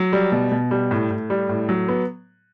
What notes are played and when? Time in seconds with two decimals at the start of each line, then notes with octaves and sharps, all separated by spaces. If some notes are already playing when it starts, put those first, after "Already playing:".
Already playing: F#3
0.13 G3
0.32 B2
0.51 B2
0.71 G3
0.91 A2
1.10 A2
1.30 G3
1.49 A2
1.69 F#3
1.88 B3